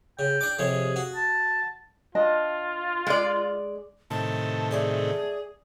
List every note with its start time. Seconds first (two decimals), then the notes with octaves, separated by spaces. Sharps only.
0.19 C#3 G5
0.41 D4 D6
0.59 F2 C3 G#4 C#5
0.96 F#4
1.15 A5
2.15 D4 F4 D#5 A5
3.07 G#3 D5
4.10 A2 C3 D#3 A5
4.71 A3 G#4 D5 E5